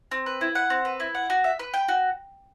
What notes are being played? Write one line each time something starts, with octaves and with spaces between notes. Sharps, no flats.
C4
B4
E4
F#5
C4
B4
E4
F#5
F#4
E5
B4
G5
F#4